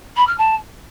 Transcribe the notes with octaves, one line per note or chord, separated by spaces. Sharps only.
B5
F6
A5